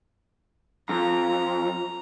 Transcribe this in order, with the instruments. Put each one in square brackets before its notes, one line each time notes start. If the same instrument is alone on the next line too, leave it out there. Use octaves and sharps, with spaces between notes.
[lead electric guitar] F2 [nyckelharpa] A#5